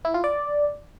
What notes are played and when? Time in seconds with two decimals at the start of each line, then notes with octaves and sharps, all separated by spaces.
0.05 E4
0.14 F4
0.24 D5